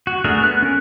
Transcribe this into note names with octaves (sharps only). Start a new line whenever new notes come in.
F#4
A3 D4 F#4 G#4 A#4
B3 F#6
C#4 A#4